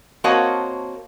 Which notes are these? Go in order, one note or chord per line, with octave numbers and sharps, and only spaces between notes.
A#3 C4 F#4 C#5 D#5 A5